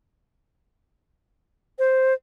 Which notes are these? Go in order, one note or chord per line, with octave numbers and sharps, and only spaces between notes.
C5